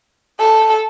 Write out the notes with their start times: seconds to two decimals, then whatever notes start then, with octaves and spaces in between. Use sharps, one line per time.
0.40 A4